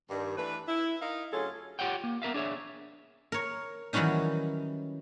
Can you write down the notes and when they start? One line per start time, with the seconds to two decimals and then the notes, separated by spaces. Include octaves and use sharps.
0.09 G2 D#3
0.37 E3 A3 D4 B4
0.68 E4
1.02 D#4 A#4 D#5 F5
1.32 D2 F#3 C#4 F4 G#4 A4
1.79 F4 G4 C#5 F#5 G5
2.04 A#3
2.22 B3 A#4 E5 F5
2.34 D4 G#4 C#5 E5
3.32 A#4 C#5
3.93 D#3 E3 F#3 G3 C#4 D#4